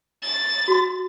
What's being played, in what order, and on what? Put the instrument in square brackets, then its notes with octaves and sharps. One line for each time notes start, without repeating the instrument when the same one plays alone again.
[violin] A6
[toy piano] F#4 C6